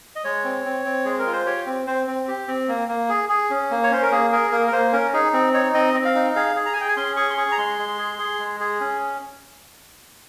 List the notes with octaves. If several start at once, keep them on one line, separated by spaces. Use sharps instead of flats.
D#5
G#3 C#5
C4
C4
C4
G#3 G#4
A#4
F4
C5
G4 C#5
C4
C4 C5
C4
G4
C4
A#3
A#3
G#4
G#4
C#4
A#3
C#5
C#4 C5
A#4
A#3 G#4
G#4 A#4
A#3 A#4
A#4
A#3 C5
C#4 A#4
D#4 G#4
C4
D#4 C#5
C4 D#5
C4
F5
D#4
G#4 F5
G#4
A#5
G#5
G#4 G5
G#5
C#4 C6
G#4 C#6
C6
G#4 C#6
A#5
G#3 C6
G#3
G#4
G#4
G#3
G#4
C#4